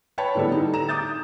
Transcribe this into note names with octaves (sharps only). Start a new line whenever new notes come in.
B4 C#5 G5 A5 B5
A2 D3 G3 B3 A4
D#4
A#5 E7
D6 D#6 G6 A6